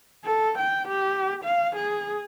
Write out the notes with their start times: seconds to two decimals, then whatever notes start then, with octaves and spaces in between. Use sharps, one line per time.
0.25 A4
0.58 G5
0.88 G4
1.45 F5
1.76 G#4